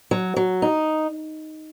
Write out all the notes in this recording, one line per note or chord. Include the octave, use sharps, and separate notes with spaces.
F#3
F#3
D#4